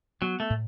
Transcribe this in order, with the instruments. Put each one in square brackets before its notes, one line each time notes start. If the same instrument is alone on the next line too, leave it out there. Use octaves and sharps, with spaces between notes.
[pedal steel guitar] F#3 [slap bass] B3
[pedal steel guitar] A3
[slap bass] A2